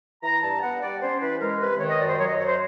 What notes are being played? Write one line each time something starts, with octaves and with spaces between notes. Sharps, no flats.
E3 A#5
G2 A5
B3 F#5
G3 D5
C#4 C5
E3 B4
G#3 A#4
C3 B4
D#3 C#5
D#5
F#2 D5
C5
F#3 C#5
D#5
F#2 C#5
C5